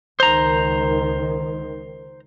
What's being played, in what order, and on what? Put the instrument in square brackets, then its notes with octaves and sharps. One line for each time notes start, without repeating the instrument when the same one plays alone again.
[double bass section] C#2 D#3 [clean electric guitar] C5 A#5